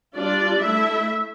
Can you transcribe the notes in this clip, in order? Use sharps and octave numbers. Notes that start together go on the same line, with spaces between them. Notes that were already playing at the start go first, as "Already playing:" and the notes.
G3 D4 F4 D5
A3 E4 E5